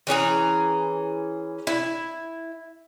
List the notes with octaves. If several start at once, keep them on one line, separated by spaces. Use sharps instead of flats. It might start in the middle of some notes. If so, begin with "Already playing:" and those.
E3 C#4 G#4 A#5
E4